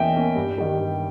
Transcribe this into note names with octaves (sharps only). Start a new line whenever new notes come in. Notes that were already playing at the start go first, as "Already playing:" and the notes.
Already playing: E2 B2 A#3 C#4 D#5 E5 G5
B2 A#3 C#4
G2
D#3 G3
G2